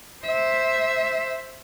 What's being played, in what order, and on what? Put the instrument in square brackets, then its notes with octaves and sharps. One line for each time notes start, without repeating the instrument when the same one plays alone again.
[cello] C5 E5